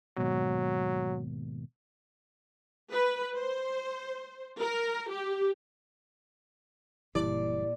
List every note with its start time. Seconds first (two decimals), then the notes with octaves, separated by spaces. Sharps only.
0.17 D#2 G#2 B2 F#3
2.91 B4
3.35 C5
4.59 A#4
5.10 G4
7.15 F#1 A#2 E3 G3 E4 G4 D5